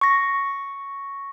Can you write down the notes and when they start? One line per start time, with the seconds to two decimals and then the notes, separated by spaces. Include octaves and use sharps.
0.01 C#6 A#6